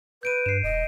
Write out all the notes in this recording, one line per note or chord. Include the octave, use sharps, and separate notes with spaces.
B4 G6 D7 D#7
G2 C7 E7
E1 D#5